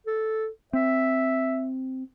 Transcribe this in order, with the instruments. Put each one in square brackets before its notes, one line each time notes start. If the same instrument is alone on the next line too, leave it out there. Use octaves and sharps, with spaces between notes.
[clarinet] A4
[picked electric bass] C4 [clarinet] E5